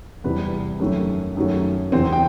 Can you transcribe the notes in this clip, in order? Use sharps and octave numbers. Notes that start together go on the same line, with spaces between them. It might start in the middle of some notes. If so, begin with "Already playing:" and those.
E2 C3 E3 G3 B4
F#2 D#3 F#3 A3
F#2 D#3 F#3 A3
E2 C3 E3 C4 C5
G5